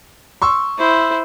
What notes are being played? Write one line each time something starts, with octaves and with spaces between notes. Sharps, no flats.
C6 C#6 E6
E4 C5